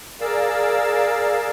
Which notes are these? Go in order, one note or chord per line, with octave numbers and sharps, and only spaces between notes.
G#4 A#4 D5 F5 E6